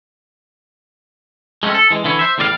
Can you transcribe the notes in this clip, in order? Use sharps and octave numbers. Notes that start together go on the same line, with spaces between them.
G#3 A3 C4 C#4
A4
E3 G#3
D3 E3 E4 C#5
C5 E5
E2 A2 G3 D5 D#5 F5